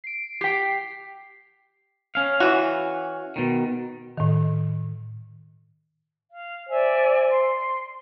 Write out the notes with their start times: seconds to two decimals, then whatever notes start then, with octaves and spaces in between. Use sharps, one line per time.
0.04 C7 D7
0.41 G4 G5 B6 C7
2.15 C#4 F5
2.40 E3 F#4
3.36 B2 D#3
4.17 A2 D#3
6.32 F5
6.69 C5 D5 E5 G#5
7.31 C6